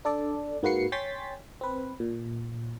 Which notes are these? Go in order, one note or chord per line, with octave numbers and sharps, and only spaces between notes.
D4 A4 D5
G#2 A#3 F#4 B4 C7 C#7
C#5 G5 G#5 C6 A6 B6
C4 B4
A#2